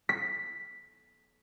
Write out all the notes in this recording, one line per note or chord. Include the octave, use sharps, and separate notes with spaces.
B6